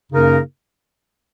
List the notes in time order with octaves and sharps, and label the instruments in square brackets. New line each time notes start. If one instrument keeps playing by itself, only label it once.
[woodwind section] F#2 C#3 A#3 D#4 A#4